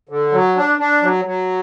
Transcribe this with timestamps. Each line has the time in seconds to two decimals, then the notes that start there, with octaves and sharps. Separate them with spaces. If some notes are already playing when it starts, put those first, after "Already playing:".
0.09 D3
0.32 F#3
0.56 D4
0.79 D4
1.02 F#3
1.25 F#3